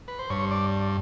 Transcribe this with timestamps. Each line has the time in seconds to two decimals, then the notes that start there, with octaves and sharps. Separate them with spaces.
0.08 B4
0.19 C5
0.30 G2 C#5
0.51 D5